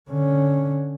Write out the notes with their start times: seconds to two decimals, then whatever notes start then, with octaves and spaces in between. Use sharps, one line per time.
0.10 D3 C#4